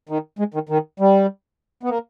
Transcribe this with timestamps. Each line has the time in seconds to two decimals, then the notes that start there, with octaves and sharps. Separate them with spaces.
0.09 D#3
0.39 G#3
0.54 D#3
0.69 D#3
1.00 G3
1.83 B3
1.89 A#3